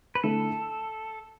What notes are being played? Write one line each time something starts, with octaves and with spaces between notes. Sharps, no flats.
B4
D3 A3 E4 A4